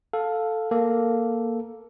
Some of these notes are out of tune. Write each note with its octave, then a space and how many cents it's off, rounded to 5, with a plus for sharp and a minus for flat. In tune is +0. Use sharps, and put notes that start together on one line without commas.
A4 +0 F5 +10
A#3 +0 A4 +0